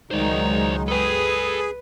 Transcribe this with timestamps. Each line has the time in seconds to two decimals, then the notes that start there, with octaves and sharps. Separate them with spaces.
0.11 C#2 D#3 F#3 G#3 D#4 C5 D5
0.88 G#4 A4 B4 G5